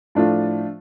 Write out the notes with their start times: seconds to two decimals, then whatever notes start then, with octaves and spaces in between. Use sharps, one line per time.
0.15 A2 F3 A3 D4 F4